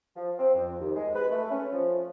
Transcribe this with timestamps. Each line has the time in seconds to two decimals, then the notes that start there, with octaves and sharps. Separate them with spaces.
0.16 F3
0.38 C4
0.55 F2
0.80 D#2
0.95 G#3
1.15 B4
1.31 A3
1.51 C#4
1.72 F3